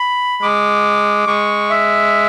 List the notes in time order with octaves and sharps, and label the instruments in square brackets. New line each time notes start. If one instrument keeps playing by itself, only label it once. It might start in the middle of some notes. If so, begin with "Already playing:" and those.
Already playing: [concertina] B5
[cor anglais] G#3 [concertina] D6
[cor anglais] G#3 [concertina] C#6
[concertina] E5